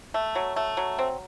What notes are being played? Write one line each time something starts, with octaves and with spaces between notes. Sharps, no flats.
A3
F#3
A3
F#3
C4